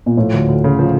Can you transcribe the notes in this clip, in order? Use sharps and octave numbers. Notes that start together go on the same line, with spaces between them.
A#2
A2 F3
D2
D2
C#3
F3